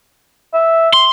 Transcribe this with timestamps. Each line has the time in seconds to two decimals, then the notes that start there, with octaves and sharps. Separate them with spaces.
0.54 E5
0.94 C6